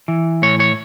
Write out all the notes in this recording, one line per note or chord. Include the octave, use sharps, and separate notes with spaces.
E3
A2 C#5
C#5